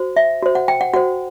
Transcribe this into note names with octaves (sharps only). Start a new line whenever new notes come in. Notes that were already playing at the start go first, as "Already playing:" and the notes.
Already playing: F#4 C5
E5
F#4 C5
F#5
G5
F#5
F#4 C5 F#5